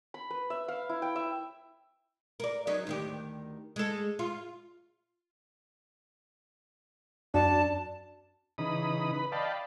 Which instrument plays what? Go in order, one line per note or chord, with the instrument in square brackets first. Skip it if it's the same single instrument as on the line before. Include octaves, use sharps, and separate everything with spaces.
[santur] B5
B4
E5
F5
E4
G5
E5
[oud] A#4 D5
F#3 C#4 D#4
D2 D#3 G4
G#3 A4
F4
[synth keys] F#2 [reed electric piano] D4 F#4 D5 [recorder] A5
[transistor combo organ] C#3 E3 D#4 B5 D#6
B4 B5
D5 D#5 F5 G5 A5 B5